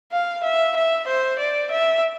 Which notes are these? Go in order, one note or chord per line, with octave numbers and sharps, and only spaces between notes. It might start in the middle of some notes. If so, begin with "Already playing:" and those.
F5
E5
E5
C5
D5
E5